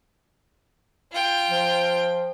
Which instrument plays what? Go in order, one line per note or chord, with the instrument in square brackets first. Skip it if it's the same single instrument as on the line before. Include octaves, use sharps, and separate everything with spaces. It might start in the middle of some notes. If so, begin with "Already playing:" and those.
[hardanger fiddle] F4 G5
[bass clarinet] F3